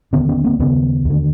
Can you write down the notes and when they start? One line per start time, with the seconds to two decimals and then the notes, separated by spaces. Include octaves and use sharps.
0.13 D#2 D3 B3 C#4
0.29 B3 C#4
0.44 A#3 C4
0.59 D#2 C#3 B3 C#4
1.05 D#2 D3